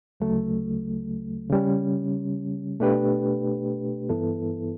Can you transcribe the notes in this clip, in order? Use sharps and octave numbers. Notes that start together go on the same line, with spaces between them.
D2 C#3 F#3 A3
C#3 G3 C#4
B2 A3 D4 G4 B4
G2 E3 B3 E4 A4